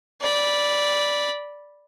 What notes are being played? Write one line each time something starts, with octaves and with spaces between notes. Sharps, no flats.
D5 B5